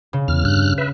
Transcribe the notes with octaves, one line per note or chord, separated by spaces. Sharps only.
C#3
E2 F6
G2 F6 F#6
B4 E5